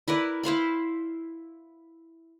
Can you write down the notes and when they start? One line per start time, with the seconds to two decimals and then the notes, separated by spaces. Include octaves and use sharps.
0.08 E4 A#4 B4 D5
0.43 E4 C5 F5 B5